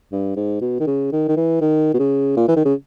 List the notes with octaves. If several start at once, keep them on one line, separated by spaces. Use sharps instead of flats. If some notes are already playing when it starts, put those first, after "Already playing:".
G2
G#2
B2
D#3
C#3
D#3
D#3
E3
D#3
B2
C#3
A#2
E3
D#3
C#3